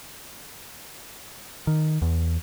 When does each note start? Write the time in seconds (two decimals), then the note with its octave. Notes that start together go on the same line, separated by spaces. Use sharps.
1.67 D#3
2.02 E2